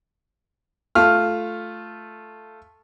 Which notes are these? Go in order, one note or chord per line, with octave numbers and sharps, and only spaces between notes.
A3 F4 F6